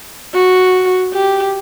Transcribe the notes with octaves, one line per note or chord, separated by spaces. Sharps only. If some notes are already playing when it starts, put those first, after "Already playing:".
F#4
G4